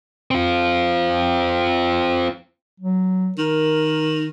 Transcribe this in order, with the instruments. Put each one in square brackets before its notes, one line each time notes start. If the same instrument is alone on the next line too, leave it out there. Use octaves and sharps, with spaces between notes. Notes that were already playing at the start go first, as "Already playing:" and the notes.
[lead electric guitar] C4 F4
[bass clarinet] F#3
[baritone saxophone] D#3 [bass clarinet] A#4